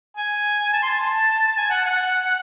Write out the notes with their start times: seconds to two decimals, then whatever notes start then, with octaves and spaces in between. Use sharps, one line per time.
0.17 G#5
0.73 A5
0.83 C6
0.91 A5
1.57 G#5
1.70 F#5
1.85 F#5